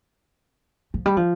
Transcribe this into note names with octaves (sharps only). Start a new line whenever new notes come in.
F3
G3
F3